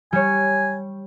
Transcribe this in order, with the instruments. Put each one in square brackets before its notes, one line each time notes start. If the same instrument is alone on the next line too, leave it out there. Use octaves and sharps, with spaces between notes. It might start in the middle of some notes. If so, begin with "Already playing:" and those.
[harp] G3 C#5 [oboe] G#5